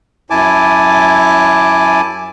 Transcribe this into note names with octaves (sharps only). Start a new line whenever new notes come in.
F#2 E4 G#5 A5 D6